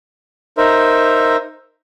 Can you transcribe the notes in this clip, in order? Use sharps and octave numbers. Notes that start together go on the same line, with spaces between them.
D#4 A#4 C5 E5